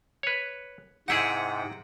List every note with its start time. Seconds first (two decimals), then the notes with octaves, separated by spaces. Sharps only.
0.23 B4 C#5
1.08 G#2 C3 D#4 E4 G#4 F#5 G5